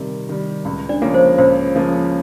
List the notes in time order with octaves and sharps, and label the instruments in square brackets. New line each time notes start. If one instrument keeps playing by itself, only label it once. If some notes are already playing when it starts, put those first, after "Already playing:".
Already playing: [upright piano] C3 D#3 G3 [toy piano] A#4
[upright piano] D#3 G3
C#2
[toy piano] D4 D5
[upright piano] C#3 F3 A#3 C#4
[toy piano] C5
[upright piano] C#2 [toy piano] C5
[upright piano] C#3 F3 A#3 C#4